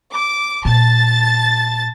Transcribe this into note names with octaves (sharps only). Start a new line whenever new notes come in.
D6
A#2 A5 A6